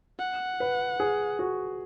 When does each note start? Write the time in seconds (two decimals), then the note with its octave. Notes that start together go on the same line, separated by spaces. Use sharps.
0.19 F#5
0.60 B4
1.00 G#4
1.39 F#4